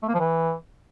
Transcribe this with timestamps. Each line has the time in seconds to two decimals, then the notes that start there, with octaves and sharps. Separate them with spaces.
0.03 A3
0.08 A#3
0.14 F3
0.20 E3